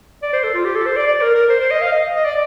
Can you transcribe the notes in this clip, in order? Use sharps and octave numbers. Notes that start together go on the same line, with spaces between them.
D5
C5
A4
F4
G4
A4
C5
D5
D5
A#4
A#4
C5
C5
D#5
F5
D#5
D#5
D5